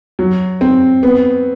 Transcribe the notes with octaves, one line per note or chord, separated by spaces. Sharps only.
F#3
C4
B3